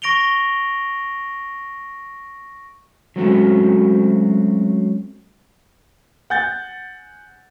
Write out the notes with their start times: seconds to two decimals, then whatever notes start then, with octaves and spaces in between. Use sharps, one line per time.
0.02 C#6 A#6 D7 F7 G7
3.16 F#3 G#3 A3 C4 C#4 F#4
6.30 F#5 G#5 G6 A6